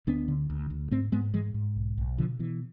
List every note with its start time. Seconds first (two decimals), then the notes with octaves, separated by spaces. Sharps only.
0.07 D2 B3 D4
0.28 D3
0.50 D2
0.70 D2
0.91 G#2 A3 C4
1.12 G#2 G#3 B3
1.34 G#2 E3 G#3
1.54 G#2
1.76 B1
1.98 B1
2.18 B2 D3 F3
2.39 B2 E3